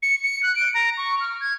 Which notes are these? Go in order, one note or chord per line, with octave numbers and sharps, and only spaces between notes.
C#7
C#7
F#6
D7
A#5
C#6
F6
G#6